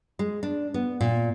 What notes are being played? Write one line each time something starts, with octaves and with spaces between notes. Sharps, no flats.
G#3
D4
B3
A#2